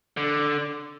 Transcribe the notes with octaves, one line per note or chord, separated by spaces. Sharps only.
D3